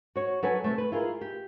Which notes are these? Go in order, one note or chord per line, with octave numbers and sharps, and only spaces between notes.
F#4 C#5
F#3 A4 B4 C#5 G#5
C3 A3
B4
E4 F4 G#4 A#4
G4